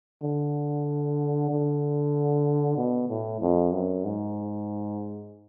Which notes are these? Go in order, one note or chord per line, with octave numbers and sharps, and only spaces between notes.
D3
D3
B2
A2
F2
F#2
G#2